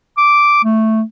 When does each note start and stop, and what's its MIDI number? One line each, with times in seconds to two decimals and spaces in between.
0.18 0.60 86
0.64 1.02 57